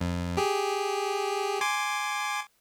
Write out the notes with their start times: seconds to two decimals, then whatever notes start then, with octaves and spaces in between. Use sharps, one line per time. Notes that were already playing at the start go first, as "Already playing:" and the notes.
0.01 F2
0.37 G4 G#4
1.61 G#5 C6 D6